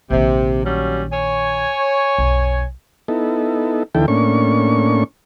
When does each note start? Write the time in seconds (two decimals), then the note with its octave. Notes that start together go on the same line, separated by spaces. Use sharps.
0.10 A#1 C3 D#3
0.64 F#3 G3 C#4
1.12 C#5 G#5
2.18 B1 F2
3.08 B3 D#4 E4 A4
3.95 D#2 D3 E3 E4 A4 G5
4.08 A2 A#3 C#4 D4 C#6